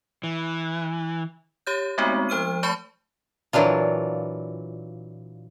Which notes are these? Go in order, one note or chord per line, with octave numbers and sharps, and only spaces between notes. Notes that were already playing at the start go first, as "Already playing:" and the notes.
E3
G4 C#5 G6
G#3 A3 B3 C4 D#4 F#4
F3 C5 F6 D#7
A3 A5 B5 C#6 G6 G7
A#2 E3 F#3 D4 F4